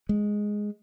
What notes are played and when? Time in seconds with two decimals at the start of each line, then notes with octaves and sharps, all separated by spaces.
0.09 G#3